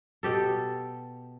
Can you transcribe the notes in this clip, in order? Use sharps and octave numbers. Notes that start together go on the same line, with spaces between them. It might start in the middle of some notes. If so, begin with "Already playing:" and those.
B2 G4 A4